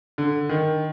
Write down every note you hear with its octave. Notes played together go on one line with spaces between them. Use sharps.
D3
D#3